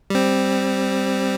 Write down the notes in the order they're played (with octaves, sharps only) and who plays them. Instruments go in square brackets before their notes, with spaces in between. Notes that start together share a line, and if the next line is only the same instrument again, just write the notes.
[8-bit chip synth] G3 C4